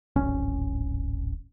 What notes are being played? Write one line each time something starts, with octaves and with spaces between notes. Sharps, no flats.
D1 G#1 C#4